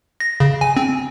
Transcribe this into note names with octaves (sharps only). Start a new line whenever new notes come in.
A#6
C#3
G#5
C4